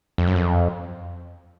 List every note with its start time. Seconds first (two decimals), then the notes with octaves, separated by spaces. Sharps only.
0.18 F2
0.27 F#2
0.36 F2